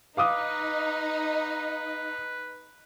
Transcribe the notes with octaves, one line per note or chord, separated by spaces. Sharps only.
D#4 B4 F5 D6 D#6